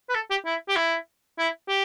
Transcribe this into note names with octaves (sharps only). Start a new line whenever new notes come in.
B4
A4
G4
E4
G4
E4
E4
G4